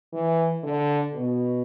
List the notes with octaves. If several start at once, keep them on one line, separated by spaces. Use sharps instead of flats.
E3
D3
B2